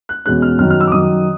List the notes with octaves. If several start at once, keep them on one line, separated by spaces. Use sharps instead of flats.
F#6
E2 B2 G#3 C#4 F#6
F6
F#2 D#3 F#3 F6
F6
E6
D6
F#2 D#3 F#3 D#6